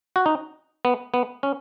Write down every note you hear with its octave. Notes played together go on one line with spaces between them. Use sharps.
F#4
D#4
B3
B3
C#4